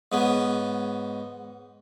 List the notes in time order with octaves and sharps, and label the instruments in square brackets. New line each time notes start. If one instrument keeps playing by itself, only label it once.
[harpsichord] G#2 B3 C#4